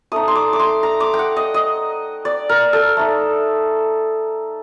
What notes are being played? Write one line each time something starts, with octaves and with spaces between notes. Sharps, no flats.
A3 D#4 D#6
C6
D6
D6
C6
A#5
D6
G5
F#5
D#5
D#5
D5
A#4
A4
A3 D#4